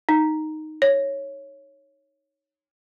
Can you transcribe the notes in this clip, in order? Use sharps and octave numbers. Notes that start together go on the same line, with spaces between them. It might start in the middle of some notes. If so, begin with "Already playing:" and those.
D#4
C#5